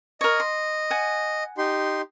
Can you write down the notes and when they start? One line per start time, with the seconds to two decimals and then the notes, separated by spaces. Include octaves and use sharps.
0.21 A#4 C#5 D#5
0.40 C6
0.90 F#5 G#5
1.58 D#4 G4 C6